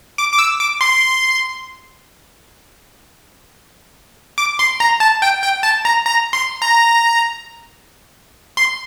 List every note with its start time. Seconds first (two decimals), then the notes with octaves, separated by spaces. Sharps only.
0.18 D6
0.33 D6
0.39 E6
0.60 D6
0.81 C6
4.38 D6
4.59 C6
4.80 A#5
5.00 A5
5.22 G5
5.42 G5
5.63 A5
5.85 A#5
6.06 A#5
6.33 C6
6.62 A#5
8.57 C6